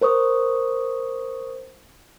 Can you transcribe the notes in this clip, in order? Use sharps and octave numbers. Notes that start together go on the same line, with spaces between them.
A#4 C5 C#6 D#6